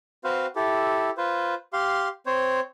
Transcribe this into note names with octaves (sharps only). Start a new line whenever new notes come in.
C4 F#4 B4 C5 F5
E4 G4 A4
F4 B4 C5
G4 F5 C6
C4 C5 C#5